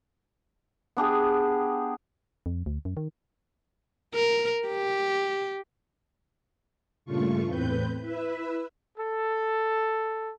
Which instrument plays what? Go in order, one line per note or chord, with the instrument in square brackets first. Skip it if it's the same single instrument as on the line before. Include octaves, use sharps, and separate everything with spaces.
[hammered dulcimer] B3 D4 G4 G#4
[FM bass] F2
D2
F#2
D#3
[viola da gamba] A#4
G4
[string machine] G2 A#2 C#3 A3 F4 C#6
E2 A2 C4 B4 G6
E4 B4 E5
[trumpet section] A4